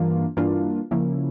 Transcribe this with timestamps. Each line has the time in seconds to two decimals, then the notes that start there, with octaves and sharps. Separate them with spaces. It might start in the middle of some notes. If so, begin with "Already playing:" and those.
Already playing: G2 E3 A#3 D4 F4
0.37 G2 E3 A#3 D4 F4
0.91 C#3 F3 A#3 C#4 E4